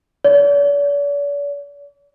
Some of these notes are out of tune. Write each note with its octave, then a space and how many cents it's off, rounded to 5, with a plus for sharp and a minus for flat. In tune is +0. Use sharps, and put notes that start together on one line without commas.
D5 -45